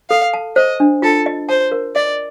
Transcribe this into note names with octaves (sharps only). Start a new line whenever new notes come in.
A4 F5
A5
C5 D#5
D4
F4 A4
D#5
C5 A5
A#4
D5 D#5